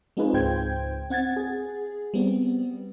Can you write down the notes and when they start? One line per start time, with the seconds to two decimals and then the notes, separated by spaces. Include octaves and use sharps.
0.17 G#3 C4 D#4 F4 G#4 B4
0.33 C#2 G#2 C5 G5 G6 G#6
1.10 C4 F#5 G#6 A6
1.37 G#4
2.14 G3 B3 C4